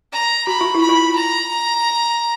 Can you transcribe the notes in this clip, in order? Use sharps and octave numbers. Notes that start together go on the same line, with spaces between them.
A#5
F#4 B5
F4
E4
B5
F4
A#5